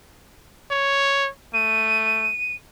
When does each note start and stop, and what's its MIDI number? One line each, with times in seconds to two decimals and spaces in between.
0.71 1.30 73
1.53 2.31 57
1.53 2.55 99